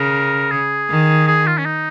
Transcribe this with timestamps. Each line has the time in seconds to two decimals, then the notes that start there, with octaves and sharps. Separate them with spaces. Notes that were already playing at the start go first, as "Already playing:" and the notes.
Already playing: C#3 A#4
0.51 G#4
0.90 D#3
1.27 G#4
1.47 F4
1.58 C#4
1.65 D#4